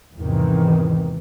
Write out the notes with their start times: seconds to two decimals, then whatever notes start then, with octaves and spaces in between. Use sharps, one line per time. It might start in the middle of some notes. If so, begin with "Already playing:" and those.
0.18 E2 G#2 C3 D#3 E3